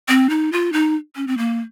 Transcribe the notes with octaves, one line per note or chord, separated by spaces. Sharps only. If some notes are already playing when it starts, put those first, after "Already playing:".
C4
D#4
F4
D#4
C#4
C4
A#3